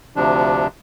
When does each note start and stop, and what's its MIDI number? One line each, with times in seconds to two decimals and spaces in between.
0.16 0.67 38
0.16 0.67 48
0.16 0.67 53
0.16 0.67 62